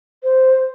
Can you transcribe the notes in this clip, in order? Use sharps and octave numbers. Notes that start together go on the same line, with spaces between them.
C5